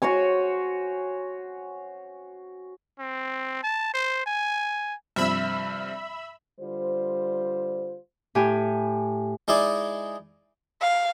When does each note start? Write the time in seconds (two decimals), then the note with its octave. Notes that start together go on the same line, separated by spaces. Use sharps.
0.02 F#4 C5 C#5 G#5
3.00 C4
3.63 A5
3.94 C5
4.26 G#5
5.16 G2 C3 F3 E5 B5 E6
6.60 D3 G3 F4 C5
8.35 A2 G4 G#5
9.48 G#3 D#4 E4 D5 G#5
10.82 F5